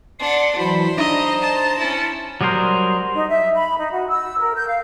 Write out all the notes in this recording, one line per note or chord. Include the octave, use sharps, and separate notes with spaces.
D4 F#5 C6
E3 F#3 C5 B5
D4 D#4 D#5 E5 A#5
A5
C#4 E4
F#3 G3 G#4 A#4 C5
D#4
E5
B5
D#4
F#4
E6
A#4
G6
F5